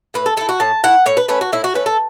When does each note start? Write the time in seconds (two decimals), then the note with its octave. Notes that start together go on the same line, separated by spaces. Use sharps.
0.14 A2 B4
0.26 A4
0.37 A3 E4 A4
0.49 F#4
0.60 A2 A5
0.84 A3 E4 F#5
1.06 A2 C#5
1.17 B4
1.28 A3 C#4 B4
1.41 F#4
1.52 A2 E4
1.64 F#4
1.74 A3 C#4 B4
1.86 A4